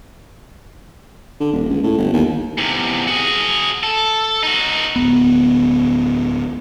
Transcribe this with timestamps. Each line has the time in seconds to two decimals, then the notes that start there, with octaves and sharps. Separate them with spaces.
1.40 D3
1.53 D#1
1.70 C#2
1.83 A2
1.98 G1
2.13 D#2
2.58 E2 C3
3.07 F#4 G#4
3.83 A4
4.43 D#4 F#4
4.96 D1 C#2 B3